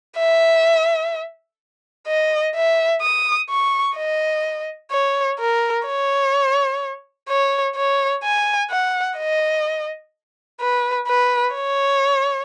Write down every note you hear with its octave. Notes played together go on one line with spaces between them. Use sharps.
E5
D#5
E5
D#6
C#6
D#5
C#5
A#4
C#5
C#5
C#5
G#5
F#5
D#5
B4
B4
C#5